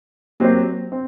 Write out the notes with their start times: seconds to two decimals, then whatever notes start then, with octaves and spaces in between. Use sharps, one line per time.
0.40 F#3 A#3 C4 G4 C5
0.92 C4